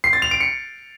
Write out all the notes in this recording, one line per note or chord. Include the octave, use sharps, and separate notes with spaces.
C7
A6
F7
D7
C#7